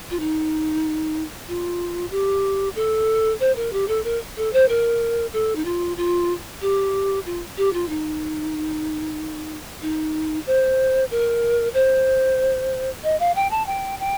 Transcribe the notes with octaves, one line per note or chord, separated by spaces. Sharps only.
F4
D#4
F4
G4
A4
C5
A#4
G4
A4
A#4
A4
C5
A#4
A4
D#4
F4
F4
G4
F4
G4
F4
D#4
D#4
C5
A#4
C5
D#5
F5
G5
A5
G5
G5